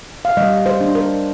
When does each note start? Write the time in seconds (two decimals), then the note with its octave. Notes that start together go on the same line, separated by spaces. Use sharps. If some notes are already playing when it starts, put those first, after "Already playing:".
0.25 F5
0.37 G3 D#5
0.66 C5
0.81 D4
0.95 A#4